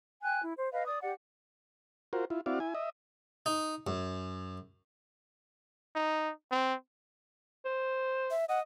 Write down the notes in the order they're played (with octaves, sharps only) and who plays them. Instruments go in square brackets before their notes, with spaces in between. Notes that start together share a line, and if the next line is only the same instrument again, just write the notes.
[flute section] G5 G#5 F#6
E4
C5
B4 D#5 F5
D5 D#6
G4 D5 F#5
[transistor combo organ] F4 F#4 A#4 C5
E4 F4
C4 E4 F#4 D5 F5
E4 G#5
D#5 E5
[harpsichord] D#4
F#2
[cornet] D#4
C4
[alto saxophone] C5
[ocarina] E5
[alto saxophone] D#5 [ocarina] F#5